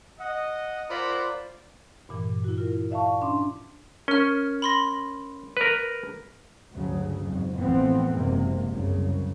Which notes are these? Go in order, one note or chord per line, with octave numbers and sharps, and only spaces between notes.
D#5 F#5
F4 A#4 C5 D5 F#5 B5
G2 A#2 E3
E4 F#4
F4 A#4
D5 E5 F5 A5 C#6
C#4 D4 C6 D6
C#4 A#4 F6
B5 C6 A#6
A#4 B4
D2 G2 C#3 F#3
F2 G#2
A1 E3 F3 A3 B3 C4
F#1 E2 G#2 C3 A#3
C2 F#2 C#3